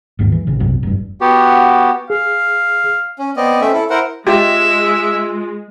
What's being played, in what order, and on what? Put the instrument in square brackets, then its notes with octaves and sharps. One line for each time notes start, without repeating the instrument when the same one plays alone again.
[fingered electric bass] G1 D#2 G#2
E3
A1 C#3
B1 F#2 C3
F1 G2
[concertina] B3 F#4 G4
[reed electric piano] G#4 [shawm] F5
[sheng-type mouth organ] C#4
B3 C4 D5 D#5
A3 C4 C#4 E5
E4 A4
E4 A#4 C5 F#5
[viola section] G#3 [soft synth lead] F4 [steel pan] G4 [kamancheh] E5